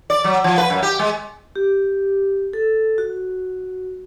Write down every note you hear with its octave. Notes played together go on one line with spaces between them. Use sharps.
D5
F#3
F3
B4
F#2
G4
G#3
G4
A4
F#4